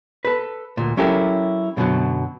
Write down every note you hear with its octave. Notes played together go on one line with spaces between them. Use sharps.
A4 B4
D2 A#2
F#3 C#4 E4 G4 A4 A#4
F#2 B2 D3 F3 F#3